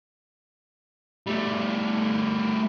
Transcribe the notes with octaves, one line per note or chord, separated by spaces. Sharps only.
G3 A3